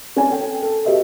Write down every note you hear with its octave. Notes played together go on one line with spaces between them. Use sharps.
C#4 G#5
A4 G5
A4
F#4 G4 B4 D#5 E5